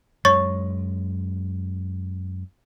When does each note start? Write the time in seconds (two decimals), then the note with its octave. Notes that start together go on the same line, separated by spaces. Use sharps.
0.25 F#2 G#3 C#5 C#6 A6